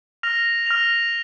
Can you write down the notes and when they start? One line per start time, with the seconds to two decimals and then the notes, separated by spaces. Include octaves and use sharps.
0.23 F6 A#6 F7
0.66 F6 A#6 F7